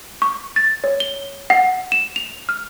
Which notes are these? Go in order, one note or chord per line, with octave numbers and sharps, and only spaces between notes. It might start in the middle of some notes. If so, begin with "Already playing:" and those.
C#6
A6
C#5
G7
F#5
E7
F7
F6